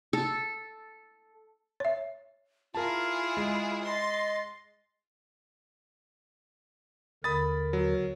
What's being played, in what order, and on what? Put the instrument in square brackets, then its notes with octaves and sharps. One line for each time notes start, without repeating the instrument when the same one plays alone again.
[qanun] A4
[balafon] C#5 E5
[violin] E4 G#4 [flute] F4 [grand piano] A#4 A5
[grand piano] G#3
[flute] D#5 [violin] C6 A6
[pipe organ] D#2 D3 A#4 [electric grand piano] B5 D#6 A6
[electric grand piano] F#3